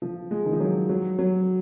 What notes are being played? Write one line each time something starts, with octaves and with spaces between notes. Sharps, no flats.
F3
G#3
D#3
F3
F#3
F#3
F#3